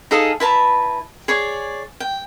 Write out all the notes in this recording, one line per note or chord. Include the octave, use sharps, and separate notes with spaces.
D#4 G#4 A4 F5
E4 B4 A5 A#5
G#4 C#5 D5
G5